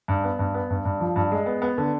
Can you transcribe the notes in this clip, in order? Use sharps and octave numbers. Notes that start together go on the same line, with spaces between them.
G2
B3
G2
B3
G2
G2
F3
G2
G#3
B3
B3
D3